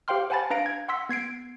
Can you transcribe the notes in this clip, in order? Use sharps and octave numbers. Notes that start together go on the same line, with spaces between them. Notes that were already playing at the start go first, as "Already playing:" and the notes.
G4 C5 F5 G5 C6 F6
C5 F#5 G#5 A5 B5 A6
D4 B4 F5 A#5 A#6 D7
G#6
F#5 C6 E6 B6
B3 G#6 C7 D7